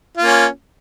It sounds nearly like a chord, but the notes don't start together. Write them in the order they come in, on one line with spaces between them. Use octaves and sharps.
F4 A#3 C#4